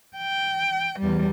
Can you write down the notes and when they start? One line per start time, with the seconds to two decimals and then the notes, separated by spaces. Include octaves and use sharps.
0.17 G5
0.99 E2 G3